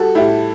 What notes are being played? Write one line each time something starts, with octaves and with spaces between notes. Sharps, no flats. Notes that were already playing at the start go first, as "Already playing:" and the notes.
Already playing: G3 F#4 A4
A2 E4 G4